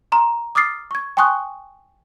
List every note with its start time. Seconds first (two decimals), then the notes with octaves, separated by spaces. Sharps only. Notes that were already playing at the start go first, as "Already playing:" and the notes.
0.12 A#5 C6
0.55 D6 D#6 F6 A6 C7
0.91 C#6 G#6
1.17 G5 G#5 C6 C#6 D#6 F#6